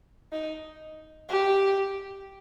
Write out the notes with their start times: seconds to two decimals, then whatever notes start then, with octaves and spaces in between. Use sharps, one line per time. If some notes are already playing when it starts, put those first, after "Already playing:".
0.32 D#4
1.29 G4